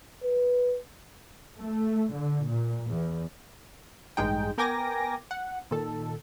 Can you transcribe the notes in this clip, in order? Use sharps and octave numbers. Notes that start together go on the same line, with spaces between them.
B4
A3
D3
A#2
E2
A1 G2 G#3 D#4 G5
B3 A#4 G5 G#5 D6 A#6
F#5
A#2 D#3 A4